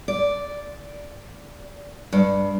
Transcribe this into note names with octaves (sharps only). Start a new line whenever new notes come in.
D5
G2